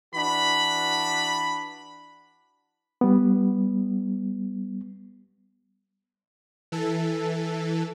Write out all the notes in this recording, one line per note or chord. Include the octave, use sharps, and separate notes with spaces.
E3 D4 F#4 B5
G3 B3
E3 A4